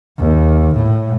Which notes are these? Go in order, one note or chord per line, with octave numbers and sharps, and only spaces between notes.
D#2
A2